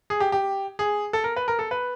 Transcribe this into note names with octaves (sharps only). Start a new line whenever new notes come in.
G#4
G4
G4
G#4
A4
A#4
B4
A#4
A4
B4